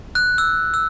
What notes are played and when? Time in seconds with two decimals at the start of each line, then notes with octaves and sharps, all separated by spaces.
0.15 F#6
0.38 E6
0.74 E6